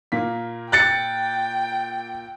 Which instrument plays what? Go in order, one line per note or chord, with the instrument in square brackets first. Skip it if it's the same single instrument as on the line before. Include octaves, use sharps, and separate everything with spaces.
[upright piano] A#2 A#3 B6
[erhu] G5 [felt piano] F#6 A6 C#7